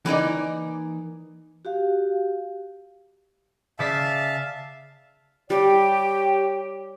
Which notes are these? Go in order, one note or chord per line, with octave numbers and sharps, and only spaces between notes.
E3 A#3 D#4 D5
F#4 G4 F5
C#3 D5 E5 F5 A5 B6
G3 G4 C#5 G5